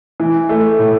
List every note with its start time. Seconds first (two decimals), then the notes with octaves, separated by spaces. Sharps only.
0.20 E3
0.49 A3
0.79 A2